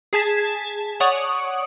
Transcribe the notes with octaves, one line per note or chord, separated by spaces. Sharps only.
G#4 G#5 A5 G#6 B6 E7
C#5 D5 F#5 C#6 D#6